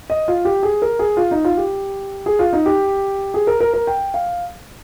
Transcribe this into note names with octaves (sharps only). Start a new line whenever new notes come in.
D#5
F4
G4
G#4
A#4
G#4
F4
D#4
F4
G4
G#4
F4
D#4
G4
G#4
A#4
A#4
A#4
G5
F5